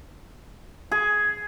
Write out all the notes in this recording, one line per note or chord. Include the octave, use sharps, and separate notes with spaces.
G#4